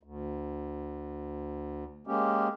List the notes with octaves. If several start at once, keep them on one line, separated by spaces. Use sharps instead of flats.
D2
G#3 A#3 C#4 G4